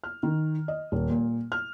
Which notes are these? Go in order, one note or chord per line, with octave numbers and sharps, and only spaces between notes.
F6
D#3
D#5
D#1
A#2
F6